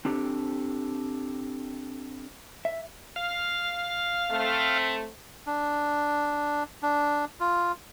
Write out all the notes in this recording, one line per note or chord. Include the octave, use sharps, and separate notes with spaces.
C4 D4 G4 A4
E5
F5
A3 C4
D4
D4
F4